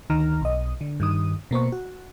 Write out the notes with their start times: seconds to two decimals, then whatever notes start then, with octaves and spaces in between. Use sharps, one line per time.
0.10 D2 D#3 A#5 F6
0.42 B1 D#5
0.81 D3
1.00 G2 D#3 D#6
1.51 B2 A#3 C5 C#6
1.72 F#4